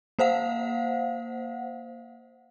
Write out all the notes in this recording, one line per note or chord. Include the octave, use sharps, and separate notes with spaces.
A#3 C5 F5 F#5